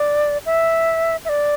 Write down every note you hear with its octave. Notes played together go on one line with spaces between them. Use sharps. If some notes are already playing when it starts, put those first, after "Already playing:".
Already playing: D5
E5
E5
D5